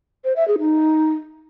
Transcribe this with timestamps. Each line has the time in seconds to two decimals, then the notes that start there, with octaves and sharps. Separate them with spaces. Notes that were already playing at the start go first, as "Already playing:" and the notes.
0.24 C5
0.36 E5
0.48 G#4
0.59 D#4